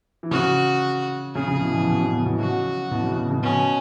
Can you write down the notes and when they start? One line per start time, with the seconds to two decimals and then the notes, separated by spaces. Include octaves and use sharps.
0.23 E3
0.31 C#3 F#4
1.35 C#3 G#4
1.48 C#3
1.61 B2 E3
1.74 B2 E3
1.87 B2
2.00 C#3
2.13 B2
2.26 B2 E3
2.39 C#3 F#3 F#4
2.91 B2 E3
3.04 C#3
3.18 B2
3.31 C#3
3.43 B2 C#4